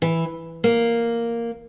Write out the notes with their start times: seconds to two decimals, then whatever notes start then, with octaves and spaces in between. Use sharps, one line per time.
0.02 E3
0.64 A#3